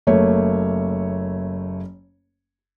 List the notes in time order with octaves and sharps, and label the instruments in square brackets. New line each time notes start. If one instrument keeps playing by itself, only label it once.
[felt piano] F#1 A3 A#3 C#5